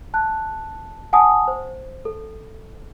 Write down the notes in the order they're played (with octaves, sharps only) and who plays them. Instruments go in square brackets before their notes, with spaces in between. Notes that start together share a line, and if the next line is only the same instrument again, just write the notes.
[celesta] A5 F#6
F#5 G#5 A5 D#6
C5
A4